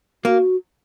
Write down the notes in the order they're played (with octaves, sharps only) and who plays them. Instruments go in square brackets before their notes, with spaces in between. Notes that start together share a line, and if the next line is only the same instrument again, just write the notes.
[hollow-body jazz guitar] A#3 [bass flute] F#4